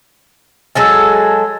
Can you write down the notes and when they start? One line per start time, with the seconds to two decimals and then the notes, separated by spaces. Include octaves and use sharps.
0.75 F#3 G#3 A4 G#5 E6